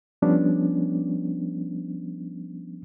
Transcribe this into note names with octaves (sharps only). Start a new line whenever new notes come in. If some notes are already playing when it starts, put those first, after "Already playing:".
F3 G3 B3 C#4 D4